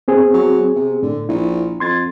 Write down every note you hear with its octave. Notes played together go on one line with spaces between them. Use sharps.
B3 C4 G#4
F#3
C3
A2 D3
A#1 E4
F2 C6 G#6 A6